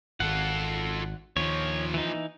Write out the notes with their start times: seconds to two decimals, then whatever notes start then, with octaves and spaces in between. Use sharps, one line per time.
0.20 G#1 F4 A4 F#5
1.37 D#2 A#2 F3 C#5
1.94 E3 D#4